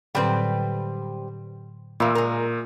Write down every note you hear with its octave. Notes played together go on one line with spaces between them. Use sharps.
A2 D3 F#3 G3 C4 B4
A#2 E3 A#3
G#3 A#4